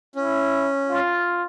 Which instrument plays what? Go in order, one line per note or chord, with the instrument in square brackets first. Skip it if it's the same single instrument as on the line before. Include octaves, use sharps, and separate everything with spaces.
[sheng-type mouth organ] C#4 [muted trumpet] E4
[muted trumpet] F4